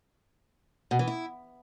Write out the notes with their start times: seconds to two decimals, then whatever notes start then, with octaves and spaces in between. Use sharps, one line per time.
0.91 B2
0.99 E3
1.08 E4